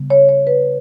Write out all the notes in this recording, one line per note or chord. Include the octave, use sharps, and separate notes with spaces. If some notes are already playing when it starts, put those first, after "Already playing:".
Already playing: C#3 G3 B3
C#5
C#5
B4